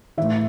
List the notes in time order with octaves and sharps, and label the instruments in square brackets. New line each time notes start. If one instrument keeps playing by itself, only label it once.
[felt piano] A2 E3 E5